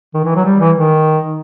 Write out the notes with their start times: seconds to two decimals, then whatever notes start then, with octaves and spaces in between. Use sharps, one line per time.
0.14 D#3
0.25 E3
0.35 F#3
0.45 G3
0.60 E3
0.76 D#3